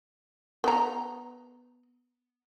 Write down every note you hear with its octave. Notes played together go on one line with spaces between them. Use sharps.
B3 A#5